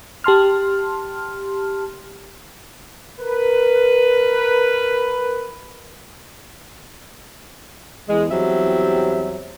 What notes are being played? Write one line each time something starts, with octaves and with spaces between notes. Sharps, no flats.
G4 A5 C6 F6
A#4 B4
E2 G#3
E2 F#3 G3 C4 E5